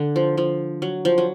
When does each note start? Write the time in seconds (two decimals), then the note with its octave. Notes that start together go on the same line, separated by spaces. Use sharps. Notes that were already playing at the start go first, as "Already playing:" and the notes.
Already playing: D3
0.16 F3
0.37 F3
0.82 F#3
1.05 F3
1.18 F#3